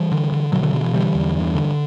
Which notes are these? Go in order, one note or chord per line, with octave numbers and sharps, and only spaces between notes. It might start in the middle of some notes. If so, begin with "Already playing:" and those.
Already playing: E3 G3
D3
D3
B2 D3 F#3
D3 F#3
B2 D3
E3
D3 E3 G3
E2
G2
D3